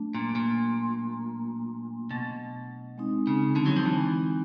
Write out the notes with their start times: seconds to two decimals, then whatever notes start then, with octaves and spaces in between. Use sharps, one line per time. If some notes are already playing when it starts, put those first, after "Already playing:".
Already playing: F#3 A3 D4
0.15 A#2
0.35 A#2
2.11 B2
2.98 G#3 C4 D#4
3.27 C#3
3.56 D3
3.66 F#3
3.76 F3
3.86 E3